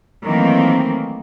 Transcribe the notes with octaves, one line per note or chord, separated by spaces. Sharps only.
D#3 E3 F#3 A3 A#3 C4